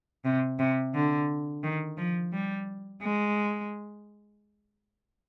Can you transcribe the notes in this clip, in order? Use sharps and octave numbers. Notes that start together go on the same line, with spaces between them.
C3
C3
D3
D#3
F3
G3
G#3